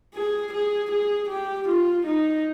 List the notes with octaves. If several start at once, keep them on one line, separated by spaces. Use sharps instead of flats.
G#4
G#4
G#4
G4
F4
D#4